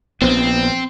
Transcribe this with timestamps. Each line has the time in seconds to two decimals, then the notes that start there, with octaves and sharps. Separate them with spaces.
0.22 A#1 B3 C4